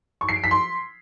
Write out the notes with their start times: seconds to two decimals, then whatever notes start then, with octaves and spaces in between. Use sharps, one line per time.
0.21 C#6
0.29 C7
0.36 D7
0.44 B6
0.51 C6